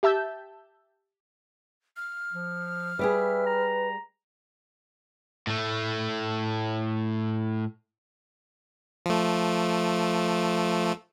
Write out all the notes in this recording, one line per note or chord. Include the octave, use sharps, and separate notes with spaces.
G4 E5 A5 E6 G6
F6
F3
G3 G4 G#4 B4 E5
A#5
A2 A3
F3 A3